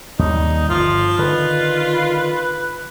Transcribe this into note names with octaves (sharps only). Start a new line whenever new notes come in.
D#2 G3 D#4
G1 F3 F4
D3 D#3 B4